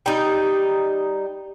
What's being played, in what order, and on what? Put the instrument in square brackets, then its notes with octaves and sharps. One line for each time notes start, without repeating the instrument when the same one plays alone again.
[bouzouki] G3 D#4